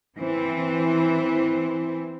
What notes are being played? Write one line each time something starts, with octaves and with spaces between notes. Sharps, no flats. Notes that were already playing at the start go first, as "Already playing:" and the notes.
E3 C4